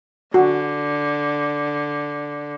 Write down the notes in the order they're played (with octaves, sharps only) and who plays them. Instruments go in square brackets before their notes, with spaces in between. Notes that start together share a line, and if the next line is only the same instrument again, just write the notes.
[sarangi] D3 [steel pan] F#4